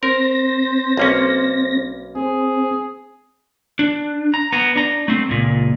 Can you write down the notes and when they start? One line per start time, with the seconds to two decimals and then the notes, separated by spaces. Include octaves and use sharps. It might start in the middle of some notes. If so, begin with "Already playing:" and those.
0.03 C4 A#4 C5 A#6
0.97 B1 A#3 C#4
2.15 C4 G#4
3.79 D4
4.34 A#5
4.52 B3 A#5
4.76 D4 A#5
5.08 A3 C4
5.29 C#2 A#2